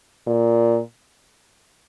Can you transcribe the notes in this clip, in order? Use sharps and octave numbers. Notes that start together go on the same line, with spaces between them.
A#2